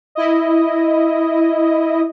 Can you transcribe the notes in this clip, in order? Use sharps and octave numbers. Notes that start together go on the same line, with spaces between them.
E4 D#5